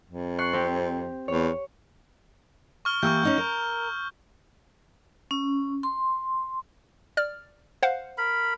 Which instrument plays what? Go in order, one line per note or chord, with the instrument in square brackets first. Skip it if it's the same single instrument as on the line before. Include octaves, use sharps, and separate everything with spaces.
[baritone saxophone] F2
[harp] C#6 F#6 C7
C4 G4
[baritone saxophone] E2 [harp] C#5
[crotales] C#6 F6 G7
[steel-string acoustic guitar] E3 A#3 G4 [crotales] C#6 E6 G6
[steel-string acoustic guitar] C#4 D#4 F#5
A#4
[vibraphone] C#4
C6
[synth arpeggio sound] D5 F6
C5 F5 F#5
[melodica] A#4 B5